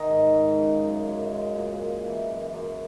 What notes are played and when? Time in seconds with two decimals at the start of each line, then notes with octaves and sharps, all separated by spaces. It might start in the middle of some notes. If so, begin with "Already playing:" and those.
Already playing: D#3 D#5
0.10 G#2
0.34 G#2
0.59 C#3
0.83 F#2
1.07 F#2
1.32 G#3
1.56 A#2
1.80 G#3
2.05 E3
2.29 F#2
2.54 F#2